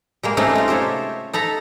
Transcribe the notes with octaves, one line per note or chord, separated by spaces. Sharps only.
G3 G#3 A#3
C3 G#3 A3 C4 C#4 D#4
D#4 F4
G4 A4 C5 C#5 E5
D#4 A4 A#5 B5